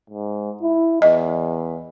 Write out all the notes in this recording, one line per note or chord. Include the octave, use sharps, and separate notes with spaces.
G#2
E4
E2 D#5